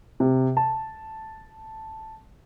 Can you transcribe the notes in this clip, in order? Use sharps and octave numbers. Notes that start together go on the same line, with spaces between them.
C3
A5